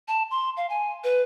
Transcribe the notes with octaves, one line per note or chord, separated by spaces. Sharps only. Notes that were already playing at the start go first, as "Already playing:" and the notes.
A5
C6
F5
G#5
B4